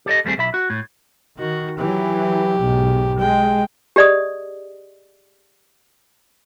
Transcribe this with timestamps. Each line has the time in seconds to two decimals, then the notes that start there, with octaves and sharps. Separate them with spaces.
0.06 G4 A4 D5 D#5
0.25 D#2 G3 A3 C4 G#4
0.38 B1 E5 B5
0.54 F#4
0.70 A2
1.39 D#3 F#4
1.79 E3 F#3 G4
2.60 B1 G#2
3.19 G#3 G5
3.96 G4 G#4 D5 D#5 D#6